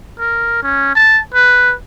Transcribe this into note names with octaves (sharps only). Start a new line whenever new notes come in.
A#4
C#4
A5
B4